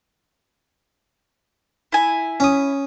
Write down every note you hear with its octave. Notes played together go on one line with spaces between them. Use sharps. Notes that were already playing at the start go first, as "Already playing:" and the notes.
E4 G#5
C#4 D#6